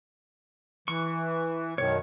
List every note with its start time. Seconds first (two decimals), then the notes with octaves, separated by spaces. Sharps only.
0.88 E3 C#6
1.78 F#2 B2 D#3 C#5